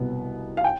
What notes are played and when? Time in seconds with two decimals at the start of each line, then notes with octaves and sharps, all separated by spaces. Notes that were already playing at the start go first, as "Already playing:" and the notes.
Already playing: C2 B2 B3
0.57 F5
0.64 G5